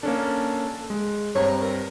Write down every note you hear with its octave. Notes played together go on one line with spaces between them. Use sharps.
A#3 C#4 D4 A4
G#3
G2 C4 C#5 A#5
A#4